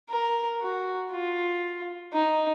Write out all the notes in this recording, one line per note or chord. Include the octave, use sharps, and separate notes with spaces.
A#4
F#4
F4
D#4